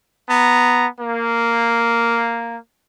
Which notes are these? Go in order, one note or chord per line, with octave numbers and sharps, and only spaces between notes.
B3 A#5
A#3